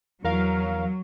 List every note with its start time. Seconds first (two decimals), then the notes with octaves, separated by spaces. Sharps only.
0.24 E2 F#3 A#4 F5